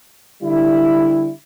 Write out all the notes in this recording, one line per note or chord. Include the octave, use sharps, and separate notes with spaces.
D3 G3 E4